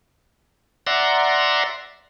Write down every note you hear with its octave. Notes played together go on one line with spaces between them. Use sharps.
D5 E5 F#5 A#5 C6